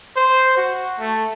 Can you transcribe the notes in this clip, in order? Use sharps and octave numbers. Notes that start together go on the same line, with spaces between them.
C5
F#4
A3